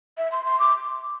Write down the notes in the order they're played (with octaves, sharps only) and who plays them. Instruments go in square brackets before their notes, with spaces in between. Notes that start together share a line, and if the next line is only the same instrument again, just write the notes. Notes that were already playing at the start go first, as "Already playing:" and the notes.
[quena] E5
C6
C6
D6